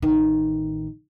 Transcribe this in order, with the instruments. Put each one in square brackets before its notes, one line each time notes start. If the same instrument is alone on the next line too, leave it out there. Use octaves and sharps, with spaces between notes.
[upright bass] A1 D#3